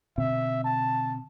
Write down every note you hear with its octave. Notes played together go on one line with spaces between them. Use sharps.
B2 D3 C4 E5
A5